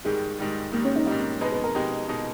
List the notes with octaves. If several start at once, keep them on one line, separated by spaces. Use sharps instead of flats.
G#2 D#3 G3 G#3
G#2 D#3 G3
G#2 D#3 G3 A#3
C#4
D#4
G#2 D#3 G3 D#4
B2 G#3 D#4 B4
B4
A#4
B2 G#3 D#4 G4
B2 G#3 D#4